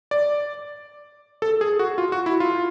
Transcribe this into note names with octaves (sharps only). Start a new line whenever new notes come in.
D5
A4
G#4
F#4
F4
F#4
E4
F4